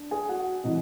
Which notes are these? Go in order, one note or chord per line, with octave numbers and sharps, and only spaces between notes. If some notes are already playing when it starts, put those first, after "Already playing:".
Already playing: D4
G#4 G#5
F#4 F#5
C3 E3 D#5